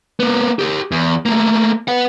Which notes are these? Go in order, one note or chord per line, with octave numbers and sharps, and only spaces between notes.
A#3 B3
G4 A#4
E2
A3 A#3
B4 F#5